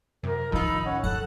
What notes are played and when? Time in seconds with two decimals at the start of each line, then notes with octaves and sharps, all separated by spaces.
0.23 F#2 C3 A#4
0.52 A1 D#3 F3 D#4 F4 B5 E6
0.86 C#4 F#5
1.04 F#2 D3 A4 F#5 F#6